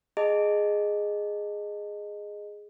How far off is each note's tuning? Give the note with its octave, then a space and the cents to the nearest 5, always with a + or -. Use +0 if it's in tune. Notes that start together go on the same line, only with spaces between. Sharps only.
G#4 +0 D#5 -15 A5 +30